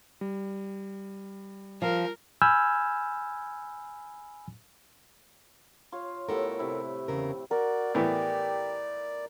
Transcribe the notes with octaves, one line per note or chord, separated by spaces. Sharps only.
G3
F3 A#4
G#5 B5 E6 F6 G6 G#6
F4 C#5 F5
A2 G3 B3 A4 A#4
C3 E4
E2 C#3 A#4
F#4 A#4 D5
A2 E3 B3 G4